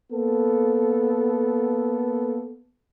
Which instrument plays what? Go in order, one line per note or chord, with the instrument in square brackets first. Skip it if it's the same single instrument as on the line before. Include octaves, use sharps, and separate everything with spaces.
[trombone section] A#3 B3 A4